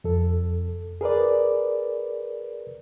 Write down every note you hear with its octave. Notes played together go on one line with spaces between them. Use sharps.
F2 A4
G#4 A#4 B4 D5